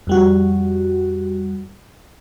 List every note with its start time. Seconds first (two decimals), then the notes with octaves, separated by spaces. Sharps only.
0.07 F2 G3 F#4